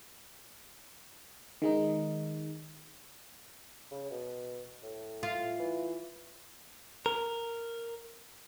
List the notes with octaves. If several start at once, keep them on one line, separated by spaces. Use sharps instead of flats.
D#3 G#3 D#4
C#3
B2
A2
F4
E3
A#4